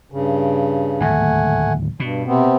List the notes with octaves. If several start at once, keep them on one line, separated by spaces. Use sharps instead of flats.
G2 C#3
D1 D#2 G#2 A3 F#5 G#5
G2 B2
C3 B3 C4